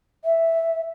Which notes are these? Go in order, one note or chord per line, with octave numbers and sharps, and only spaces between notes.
E5